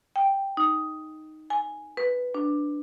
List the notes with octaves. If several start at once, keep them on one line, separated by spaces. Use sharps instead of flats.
G5
D#4
G#5
B4
D4